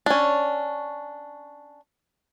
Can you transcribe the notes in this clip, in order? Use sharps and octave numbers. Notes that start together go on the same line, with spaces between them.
C#4 D4